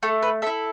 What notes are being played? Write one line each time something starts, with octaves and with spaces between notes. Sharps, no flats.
A3 A4
B4
E4 A4 E5